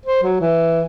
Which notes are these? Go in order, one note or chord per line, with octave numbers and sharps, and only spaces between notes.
C5
F#3
E3